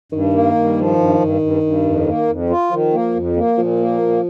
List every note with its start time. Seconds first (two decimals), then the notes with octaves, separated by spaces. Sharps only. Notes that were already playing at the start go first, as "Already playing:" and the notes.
0.12 G2 D#3
0.33 A#3
0.55 G2
0.77 F3
0.98 G2
1.20 G2
1.42 G2
1.63 G2
1.85 F2
2.06 A#3
2.28 F2
2.50 F4
2.71 D#3 F3
2.93 A#3
3.15 F2
3.36 A#3
3.58 A#2 F3
3.80 A#3
4.01 A#2